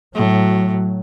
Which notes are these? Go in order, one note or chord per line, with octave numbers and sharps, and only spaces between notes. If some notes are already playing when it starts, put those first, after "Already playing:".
A2 F#3